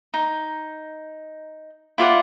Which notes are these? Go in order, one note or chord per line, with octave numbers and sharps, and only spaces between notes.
D#4
E4 F4 D5 F#5